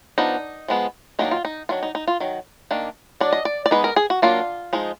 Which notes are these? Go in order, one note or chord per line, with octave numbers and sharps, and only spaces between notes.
F3 B3 D4 D#4
F3 G#3 B3
D#3 F#3 A#3 D4 D#4
F4
D#4
D#3 F#3 D4 F4
D#4
D#4
F4
D#3 F#3
D#3 A#3 D4
F#3 D4 D5
D#5
D5
D5
G#3 B3 D#4 B4
A#4
G#4
F#4
F#3 A#3 D4 F4
F3 G#3 D#4